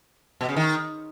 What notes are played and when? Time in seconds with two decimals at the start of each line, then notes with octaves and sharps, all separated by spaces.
0.41 B2
0.48 C#3
0.56 D#3